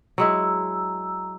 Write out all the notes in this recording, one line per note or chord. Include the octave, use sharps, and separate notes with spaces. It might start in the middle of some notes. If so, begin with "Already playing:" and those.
F#3 G#3 E4 A#5 E6